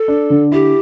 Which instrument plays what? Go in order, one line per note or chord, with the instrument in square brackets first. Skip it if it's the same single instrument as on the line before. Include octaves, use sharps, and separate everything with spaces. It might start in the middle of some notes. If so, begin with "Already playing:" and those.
Already playing: [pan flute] A4
[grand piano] D4
D3
[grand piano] E4 [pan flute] G4